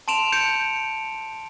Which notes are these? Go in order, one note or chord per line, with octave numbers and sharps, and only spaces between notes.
A5 C6 D7 E7 F7
G6 C#7 D7